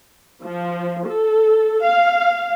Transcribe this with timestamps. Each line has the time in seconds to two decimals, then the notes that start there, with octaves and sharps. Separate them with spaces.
0.43 F3
1.06 A4
1.82 F5